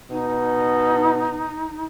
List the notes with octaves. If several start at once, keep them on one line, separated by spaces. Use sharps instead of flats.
B2 D#4